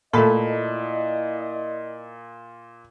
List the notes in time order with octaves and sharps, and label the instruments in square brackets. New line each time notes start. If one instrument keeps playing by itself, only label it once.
[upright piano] A#2 B5 [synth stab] A3 A4 [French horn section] E4 D5 D#5